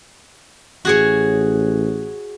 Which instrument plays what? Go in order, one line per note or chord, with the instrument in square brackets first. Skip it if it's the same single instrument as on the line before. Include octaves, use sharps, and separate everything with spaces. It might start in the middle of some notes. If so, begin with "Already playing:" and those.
[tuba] A1 [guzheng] F#4 G#4 C#5